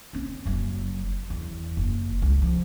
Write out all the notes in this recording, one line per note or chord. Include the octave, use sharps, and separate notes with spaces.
C4 C#4
F#1 F#3
E2
F#1
C#2
F3